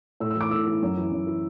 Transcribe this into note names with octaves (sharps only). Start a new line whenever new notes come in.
A2 E6
E6
E3 D6
A2 E6
E3
F#2
E3
F#2
E3